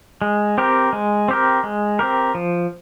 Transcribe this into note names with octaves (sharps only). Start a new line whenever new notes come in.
G#3
C4 G4 A#4
G#3
C4 G4 A#4
G#3
C4 G4 A#4
F3